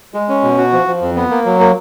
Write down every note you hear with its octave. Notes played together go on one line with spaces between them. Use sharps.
G#3
C#4
B2
F#4
F3
F3
F2
B3
A#3
F#3
A#3